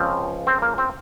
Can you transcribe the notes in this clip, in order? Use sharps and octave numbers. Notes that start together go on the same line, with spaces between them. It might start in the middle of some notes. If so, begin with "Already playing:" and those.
Already playing: C#2 C#3 F3 C4
C4
A#3
C4